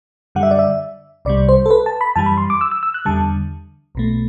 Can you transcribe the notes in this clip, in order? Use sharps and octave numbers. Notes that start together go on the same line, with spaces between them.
F#2 D3 G3 F#5
E5
D5
E5
C2 C3 G3 D5
C5
A4
B4
A5
B5
F#2 E3 G3 A5
B5
C6
D6
E6
E6
E6
F#6
E2 D3 G3 A5
B1 B2 A3